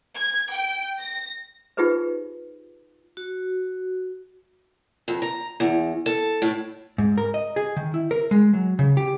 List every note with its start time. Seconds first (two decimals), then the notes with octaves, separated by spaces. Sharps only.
0.16 G#6
0.52 G5
1.00 A#6
1.77 D#4 F4 G4 G#4 B4 C5
3.17 F#4
5.08 F2
5.22 A#5
5.60 E2
6.06 A4
6.42 A2
6.98 G#2
7.18 A#4
7.34 D#5
7.56 G#4
7.76 D#3
7.94 E4
8.11 A#4
8.31 G#3
8.53 F#3
8.79 C#3
8.97 G4